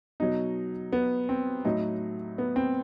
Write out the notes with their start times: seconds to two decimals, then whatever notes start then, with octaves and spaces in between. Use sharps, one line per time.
0.20 B2 F#3 D#4
0.92 B3
1.29 C4
1.65 A2 F#3 D#4
2.38 B3
2.56 C4